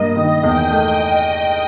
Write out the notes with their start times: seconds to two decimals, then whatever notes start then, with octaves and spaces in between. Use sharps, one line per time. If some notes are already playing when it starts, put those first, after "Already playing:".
Already playing: G2 A#3 D#5
0.16 D#3
0.43 E2 G5
0.71 A3